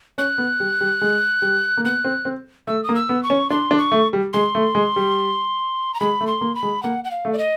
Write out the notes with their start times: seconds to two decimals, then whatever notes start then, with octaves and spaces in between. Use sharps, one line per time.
0.18 C#4 F#6
0.38 B3
0.60 G3
0.81 G3
1.01 G#3
1.42 G3
1.77 A#3
1.84 B3 F#6
2.04 C4
2.25 C4
2.67 A3 E6
2.84 D#6
2.89 A#3
2.95 E6
3.09 B3
3.23 C#6
3.30 C#4
3.50 D4 C6
3.71 D4
3.78 C#6
3.92 A3
4.13 G3
4.33 G#3 C6
4.55 A3
4.75 G#3
4.96 G3
5.94 A#5
6.00 G#3 B5
6.21 A3
6.27 C6
6.41 A#3
6.55 B5
6.63 G#3
6.83 A#3 F#5
7.04 F#5
7.11 F5
7.25 A3
7.33 D5
7.38 D#5